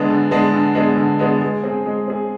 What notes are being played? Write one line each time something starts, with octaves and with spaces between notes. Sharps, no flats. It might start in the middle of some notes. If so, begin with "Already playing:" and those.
Already playing: D3 G#3 B3 D4
D3
G#3 B3 D4
D3
G#3 B3 D4
D3
G#3 B3 D4
G#3
C4 G#4
G#3
C4 G#4